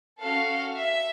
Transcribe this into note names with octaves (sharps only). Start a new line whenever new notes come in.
C#4 F#4 A4 F5
E5